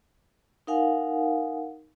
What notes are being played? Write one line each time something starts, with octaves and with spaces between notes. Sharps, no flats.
D#4 A#4 F5 F#5 G#5